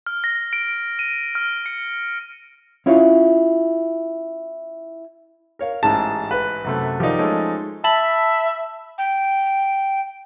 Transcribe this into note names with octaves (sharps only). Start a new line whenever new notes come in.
F6
A#6
D7
D#7
F6
C#7
C#4 E4 F4 C#5
A#4 C#5 F5
A1 G#2 G#4 A5
B4
F#2 C3 A3
F3 D#4 G4 A#4 D5
G#3 A3 C#4
E5 A5 B5
G5